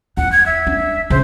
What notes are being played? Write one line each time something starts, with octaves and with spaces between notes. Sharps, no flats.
E2 F#5
G#6
E5
D4
C#3 C5